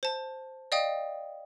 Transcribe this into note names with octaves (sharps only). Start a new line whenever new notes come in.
C5 A5
D5 D#5 F5 G5 D#6